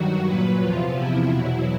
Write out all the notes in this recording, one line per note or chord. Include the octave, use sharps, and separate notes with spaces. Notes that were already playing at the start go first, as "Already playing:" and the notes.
Already playing: G2 D#3 F#3 F#4
A#2 F#3 B4
E2 C3 F3 F4
E2 C3 F3 E4
E2 B2 F#3